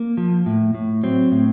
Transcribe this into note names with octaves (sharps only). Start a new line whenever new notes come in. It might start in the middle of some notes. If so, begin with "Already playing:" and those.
Already playing: A#3
F3
A2
A2
F#3 C4
A2